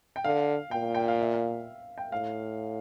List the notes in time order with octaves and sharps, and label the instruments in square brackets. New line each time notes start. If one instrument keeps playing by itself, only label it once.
[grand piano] G5
[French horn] D3 [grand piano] F5
[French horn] A#2 [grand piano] G5
[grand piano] G5
F5
E5
F5
G5
[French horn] A2 [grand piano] F5